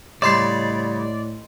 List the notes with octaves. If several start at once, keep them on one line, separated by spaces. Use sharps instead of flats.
A2 C#3 G3 D5 D#5 C6 C7